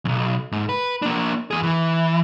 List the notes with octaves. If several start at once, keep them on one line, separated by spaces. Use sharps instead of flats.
B1 E2
G#2
B4
A#3 D4
E2 G#4
E3